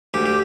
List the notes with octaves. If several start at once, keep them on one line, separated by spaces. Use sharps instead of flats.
D2 G4
G4